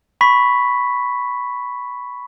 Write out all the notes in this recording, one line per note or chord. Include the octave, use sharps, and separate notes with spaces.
B5 C#6 B6